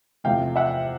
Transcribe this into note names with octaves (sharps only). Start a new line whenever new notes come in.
E2 C3 F3 A3 F5 G5
E5 F#5